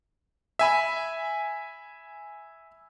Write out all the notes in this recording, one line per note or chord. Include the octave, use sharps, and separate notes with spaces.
E5 G#5 B5